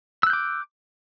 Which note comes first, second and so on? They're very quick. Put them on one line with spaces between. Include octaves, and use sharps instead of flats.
E6 F#6 G6 D6